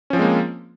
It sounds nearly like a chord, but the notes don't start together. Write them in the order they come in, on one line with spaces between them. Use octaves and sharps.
C#4 F3 C4 G#3 A#3